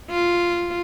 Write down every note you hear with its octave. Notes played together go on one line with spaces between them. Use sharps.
F4